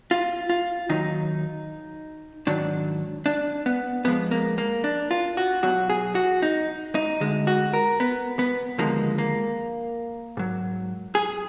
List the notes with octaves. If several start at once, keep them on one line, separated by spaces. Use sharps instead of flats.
F4
F4
D#2 D#3 F#3 D#4
G#2 D#3 F#3 D4
D4
B3
F2 F3 G#3 B3
A#3
A#3
D4
F4
F#4
B1 B2 F#3 F#4
G#4
F#4
D#4
D#4
D2 D3 G#3
F#4
A#4
B3
B3
D#2 D3 F3 G#3 A#3
A#3
G#2 F#3
G#4